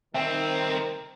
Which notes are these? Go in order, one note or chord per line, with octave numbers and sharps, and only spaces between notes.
C2 D#3 C4 E5 G5
A#4